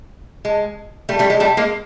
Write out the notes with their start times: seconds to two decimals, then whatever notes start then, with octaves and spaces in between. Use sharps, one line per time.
0.45 G#3
1.09 G3 A3
1.19 G3 A3
1.30 G#3
1.40 G3 A3
1.57 G#3 A#3